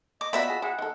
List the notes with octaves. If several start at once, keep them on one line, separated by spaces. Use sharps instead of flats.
D#5 D6
F3 B3 F#4 D5 E5 B5
F4 G#4
E4 G#4 F#5
D#3 A4